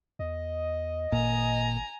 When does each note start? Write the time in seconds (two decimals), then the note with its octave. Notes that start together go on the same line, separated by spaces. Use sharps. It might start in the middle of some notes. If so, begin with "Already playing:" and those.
0.19 E2 D#5
1.12 G#1 A#2 G#5 A#5